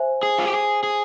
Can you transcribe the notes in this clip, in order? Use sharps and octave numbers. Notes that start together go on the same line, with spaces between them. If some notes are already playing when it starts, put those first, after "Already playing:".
Already playing: C5 E5 G#5
G#4
F4
G4
G#4
G#4